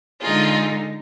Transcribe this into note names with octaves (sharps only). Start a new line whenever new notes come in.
D3 G#3 D#4 F4 G#4